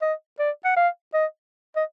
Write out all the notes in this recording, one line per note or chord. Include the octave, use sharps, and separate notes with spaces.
D#5
D5
F#5
F5
D#5
D#5